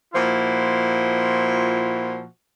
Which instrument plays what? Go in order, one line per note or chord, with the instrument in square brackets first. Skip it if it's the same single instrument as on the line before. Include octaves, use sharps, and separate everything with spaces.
[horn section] A#2 F3 E4 F#4